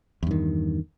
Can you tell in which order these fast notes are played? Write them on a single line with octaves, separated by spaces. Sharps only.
E2 G2 D#3